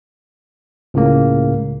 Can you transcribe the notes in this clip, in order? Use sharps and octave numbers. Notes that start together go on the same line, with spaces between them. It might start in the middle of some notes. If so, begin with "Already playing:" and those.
C#2 A2 C#3 A#3